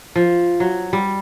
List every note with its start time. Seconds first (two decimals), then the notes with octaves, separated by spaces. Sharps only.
0.16 F3
0.60 F#3
0.93 G3